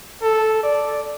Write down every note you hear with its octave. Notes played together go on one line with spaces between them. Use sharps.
A4
D5